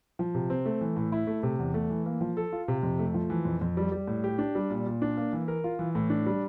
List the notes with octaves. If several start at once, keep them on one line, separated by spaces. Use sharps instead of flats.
F3
C3
C4
A3
E3
A2
E4
A3
C3
E2
A3
E3
A#3
F3
A4
F4
C3
F2
A3
F3
E3
F2
F2
G3
G3
A2
G4
D4
G3
A#2
A#2
D4
A#3
E3
A#4
F4
E3
A2
D4
G3